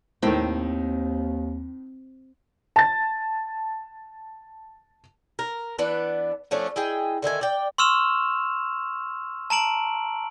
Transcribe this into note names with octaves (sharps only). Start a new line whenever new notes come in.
D#2 A2 D#3 C4
A5 A6
A#4
E3 B3 D4 B4
F3 A3 C#4 D4
E4 G#4 D#5 G5
D3 D#3 E5 G#5
D5 G5
C6 C#6 E6 F6 E7 F7
A5 A#5 D7 F#7